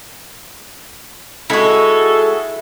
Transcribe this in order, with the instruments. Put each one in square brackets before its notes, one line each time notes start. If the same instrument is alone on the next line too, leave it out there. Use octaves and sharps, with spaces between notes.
[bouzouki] G#3 F#4 [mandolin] E4 [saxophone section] A4